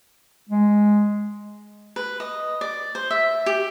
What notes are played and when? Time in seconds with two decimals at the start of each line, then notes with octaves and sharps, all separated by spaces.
0.50 G#3
1.96 B4
2.20 D#5
2.61 D5
2.95 C5
3.10 E5
3.46 G4